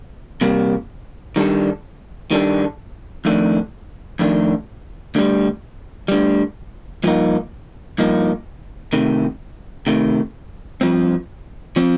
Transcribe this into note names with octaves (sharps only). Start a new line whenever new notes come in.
C3 G3 A#3
D#3 G3 D4 A4
D#3 G3 D4 A4
F2 D#3 A3 D4
F2 D#3 A3 D4
D2 D3 G3
D2 D3 G3
G2 F3 A#3 D#4
G2 F3 A#3 D#4
C3 D#3 A3
C3 D#3 A3
G2 F3 C4
F3 C4